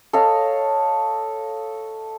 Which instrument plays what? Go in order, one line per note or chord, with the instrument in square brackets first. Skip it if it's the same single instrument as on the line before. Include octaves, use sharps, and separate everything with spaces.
[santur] A4 C#5 D#5 F5